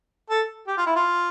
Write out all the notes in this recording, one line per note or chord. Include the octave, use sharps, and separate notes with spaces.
A4
G4
F4
E4
F4